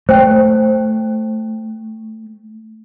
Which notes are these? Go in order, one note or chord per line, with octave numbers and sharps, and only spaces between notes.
A3 C5 G5